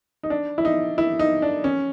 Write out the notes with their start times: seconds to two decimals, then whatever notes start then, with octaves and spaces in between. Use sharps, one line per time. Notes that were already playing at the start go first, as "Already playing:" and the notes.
0.23 D#4
0.30 D4
0.58 E4
0.65 D#4
0.98 E4
1.19 D#4
1.42 D4
1.64 C#4